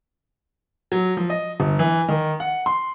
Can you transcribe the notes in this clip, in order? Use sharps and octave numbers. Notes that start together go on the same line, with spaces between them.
F#3
F3
D#5
G1
E3
D#3
F#5
C6